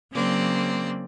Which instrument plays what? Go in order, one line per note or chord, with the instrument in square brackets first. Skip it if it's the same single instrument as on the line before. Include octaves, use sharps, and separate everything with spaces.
[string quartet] C#3 F#3 A#3 C4 D5